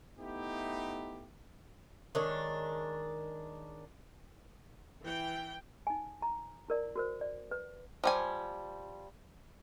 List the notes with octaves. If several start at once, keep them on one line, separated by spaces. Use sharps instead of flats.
A3 B3 D#4 E4 G4
D#3 G#3 D4 C#5
E3 G5
D#4 G#5
A#5
E4 A#4 D5
F#4 A#4 C5
D5
B4
F3 G3 G#5